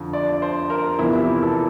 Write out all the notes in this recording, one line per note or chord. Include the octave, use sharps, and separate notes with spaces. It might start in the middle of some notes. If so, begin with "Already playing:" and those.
Already playing: F2 D3 F3
D5
C5
A#4
E2 C3 F3 E4
E4
A#4
A4